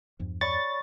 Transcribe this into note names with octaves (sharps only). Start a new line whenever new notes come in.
E2 G2 F3
C#5 D5 B5 C#6 A6